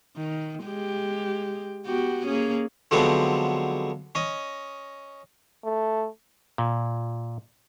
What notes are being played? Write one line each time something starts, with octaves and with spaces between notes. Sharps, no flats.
D#3
G#3 G4
B3 F#4 G4
A#3 C#4 G#4
D3 F3 F#3 G#3 B3 C4
C#4 D#5
A3
A#2